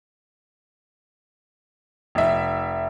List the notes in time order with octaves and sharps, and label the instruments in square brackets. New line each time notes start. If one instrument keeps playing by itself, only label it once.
[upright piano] F1 E5